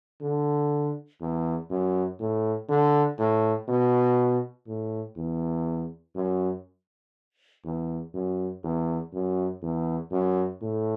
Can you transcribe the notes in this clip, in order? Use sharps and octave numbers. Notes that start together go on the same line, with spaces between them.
D3
E2
F#2
A2
D3
A2
B2
A2
E2
F#2
E2
F#2
E2
F#2
E2
F#2
A2